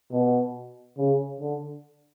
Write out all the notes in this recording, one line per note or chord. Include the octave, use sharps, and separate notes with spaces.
B2
C#3
D3